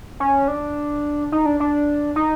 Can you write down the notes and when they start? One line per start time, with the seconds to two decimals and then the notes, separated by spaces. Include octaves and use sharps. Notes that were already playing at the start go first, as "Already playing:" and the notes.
0.20 C#4
0.48 D4
1.32 D#4
1.46 D4
1.60 D4
2.16 D#4